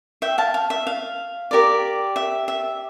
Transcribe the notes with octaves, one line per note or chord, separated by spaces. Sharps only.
E5 G5
F5 A5
F5
E5
F5
G4 A#4 D5
E5
E5